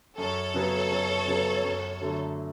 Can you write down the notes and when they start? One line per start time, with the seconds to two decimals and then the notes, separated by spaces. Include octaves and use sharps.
0.17 F#2 A4 C#5
0.54 C#3 F#3 B3
0.91 F#2
1.28 C#3 F#3 B3
1.64 F#2
2.01 D3 F#3 A3